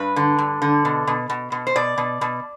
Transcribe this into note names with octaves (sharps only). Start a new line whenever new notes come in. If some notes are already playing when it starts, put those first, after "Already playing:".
Already playing: G2 B4
D3
G2
D3
B2
B2
B2
B2
C5
B2 D5
B2
B2